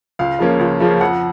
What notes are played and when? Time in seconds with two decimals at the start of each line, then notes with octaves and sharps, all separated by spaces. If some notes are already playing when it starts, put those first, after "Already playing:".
0.19 C#2 F5
0.39 C#3 F3 A#3 C#4
0.59 C#2
0.80 C#3 F3 A#3 C#4
1.01 F2 F#5